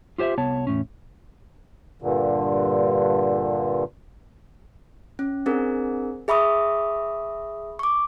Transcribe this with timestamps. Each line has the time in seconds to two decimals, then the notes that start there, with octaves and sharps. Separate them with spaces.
0.18 F4 G4 C5 D5 E5
0.38 C2 B3 C#5 A5
0.67 E2 A2 C#4
2.02 G2 A#2 D3
5.19 C#4
5.46 C4 D4 G#4 A#4
6.28 G#4 E5 B5 C#6 D#6
7.79 C#6 D6